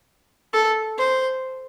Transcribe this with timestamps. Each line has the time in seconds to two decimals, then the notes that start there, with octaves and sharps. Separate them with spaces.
0.53 A4
0.98 C5